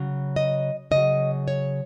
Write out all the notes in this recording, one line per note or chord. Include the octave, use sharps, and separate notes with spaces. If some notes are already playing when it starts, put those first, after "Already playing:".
Already playing: C#3 F#3
D#5
C#3 F#3 D#5
C#5